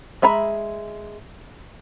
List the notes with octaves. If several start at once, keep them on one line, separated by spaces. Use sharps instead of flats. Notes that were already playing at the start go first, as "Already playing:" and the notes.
G#3 E5 A#5 B5